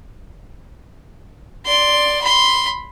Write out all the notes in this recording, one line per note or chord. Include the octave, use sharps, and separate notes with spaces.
D5 C6
B5 C6